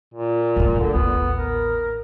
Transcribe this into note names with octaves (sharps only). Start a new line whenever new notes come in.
A#2
F#2 A2
D3
A1 D#2 B3
A#4